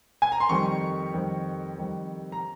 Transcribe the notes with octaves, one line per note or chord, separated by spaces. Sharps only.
G#5
A#5
C6
F2 D#3 G3 C#6
F2 D#3 G3
F2 D#3 G3
A#5